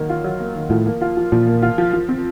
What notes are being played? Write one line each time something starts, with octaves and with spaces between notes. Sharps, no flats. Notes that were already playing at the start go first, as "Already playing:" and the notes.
Already playing: D#3 F#3 A#3
F4
F#3
A#3
D#3
A2 F3
A#3
F4
F3
A#2 F3
A#3
F4
F3
F3
C4